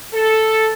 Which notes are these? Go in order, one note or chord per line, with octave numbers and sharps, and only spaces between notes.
A4